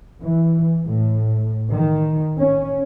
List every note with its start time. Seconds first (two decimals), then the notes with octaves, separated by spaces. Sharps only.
0.21 E3
0.84 A2
1.70 D#3
2.39 C#4